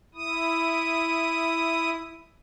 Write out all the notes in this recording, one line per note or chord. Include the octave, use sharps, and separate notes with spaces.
E4 D#6